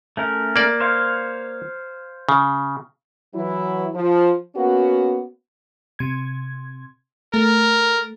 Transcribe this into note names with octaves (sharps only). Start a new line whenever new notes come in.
A3 C#4 A#4
A#3 D5
C5 C#5 F5
C#3
E3 F#3 E4
F3
A#3 B3 C#4 F#4
C3 G#6
A3 A#4